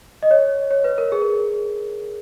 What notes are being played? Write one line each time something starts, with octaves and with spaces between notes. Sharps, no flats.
D#5
C#5
C#5
B4
A#4
G#4
A#4